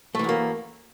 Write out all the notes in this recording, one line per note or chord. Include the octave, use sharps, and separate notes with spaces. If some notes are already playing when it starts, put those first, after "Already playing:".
F#2 E3 A3 A#3